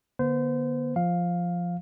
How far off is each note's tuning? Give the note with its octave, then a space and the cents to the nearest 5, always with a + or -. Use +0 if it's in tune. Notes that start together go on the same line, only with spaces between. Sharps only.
D3 +0 B3 -40 C5 -30
F3 +0 F5 +10